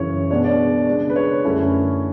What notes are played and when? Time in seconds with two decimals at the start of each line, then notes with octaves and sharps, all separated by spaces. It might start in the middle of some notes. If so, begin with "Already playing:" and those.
Already playing: F#2 C#3 E3 C#5
0.30 B2 G#3 B3 D4 C#5
0.44 D5
0.87 C#3 G#3 D4
1.10 B4
1.16 C#5
1.44 F#2 D3 A3 C#4 E4